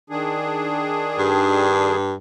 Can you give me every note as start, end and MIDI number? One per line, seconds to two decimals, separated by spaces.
0.10 1.96 51
0.10 1.96 62
0.10 1.96 68
1.19 2.14 43